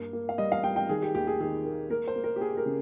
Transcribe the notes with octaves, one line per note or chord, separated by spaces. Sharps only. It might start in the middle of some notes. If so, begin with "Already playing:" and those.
Already playing: G2 A#3
A#3
F5
G3 D#5
F5
G3 G5
G5
D#3 G#4
G4
D#2 G4
G#4
D#3 G#4
A#3
A#3 A#4
C5
A#3
A#4
G4
A#3 G#4
A#4
C#3